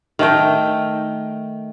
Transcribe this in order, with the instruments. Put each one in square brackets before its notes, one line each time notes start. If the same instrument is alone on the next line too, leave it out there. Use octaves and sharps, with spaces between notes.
[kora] D#3 A3 G5